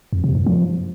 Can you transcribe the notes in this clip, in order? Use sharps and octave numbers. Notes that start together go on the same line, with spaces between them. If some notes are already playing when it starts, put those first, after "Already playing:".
F2
C3
F#2
F3